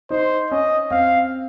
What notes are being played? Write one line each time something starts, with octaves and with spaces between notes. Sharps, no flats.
D#4 C5
C#4 D#5
C4 F5